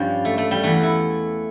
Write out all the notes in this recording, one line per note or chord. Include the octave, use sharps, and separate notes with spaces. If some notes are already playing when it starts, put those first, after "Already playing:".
Already playing: G2 F3 G3 C#4
A3
A3
G3
E2 E3 A3
E4